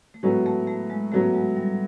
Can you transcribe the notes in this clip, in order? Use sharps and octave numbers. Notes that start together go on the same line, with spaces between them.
A3
A2 F#3 G#3 B3
A3
A3
G#3
A2 F#3 A3 B3
G#3
G3